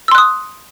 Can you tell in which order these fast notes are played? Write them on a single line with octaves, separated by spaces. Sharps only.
E6 C6 F#6 D#6